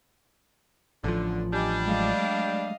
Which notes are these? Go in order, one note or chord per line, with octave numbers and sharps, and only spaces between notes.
A1 D3 F3
G3 D4 D#5 G#5
F#3 G#3 A3 D#5 F5